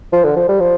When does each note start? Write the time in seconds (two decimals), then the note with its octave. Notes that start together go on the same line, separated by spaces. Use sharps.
0.13 F3
0.24 D3
0.36 F3
0.49 G3
0.60 F3